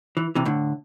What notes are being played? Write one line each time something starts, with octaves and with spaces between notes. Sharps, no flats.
E3
C3 E3
A2 D3